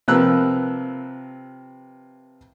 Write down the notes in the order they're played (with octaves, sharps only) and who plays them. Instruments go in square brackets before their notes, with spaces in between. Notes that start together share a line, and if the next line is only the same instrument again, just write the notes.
[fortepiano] C3 F3 A#4 B4 E6 F#6